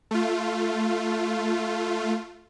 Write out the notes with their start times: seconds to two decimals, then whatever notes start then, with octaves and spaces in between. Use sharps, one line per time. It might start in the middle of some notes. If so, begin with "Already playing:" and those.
0.11 A3 F4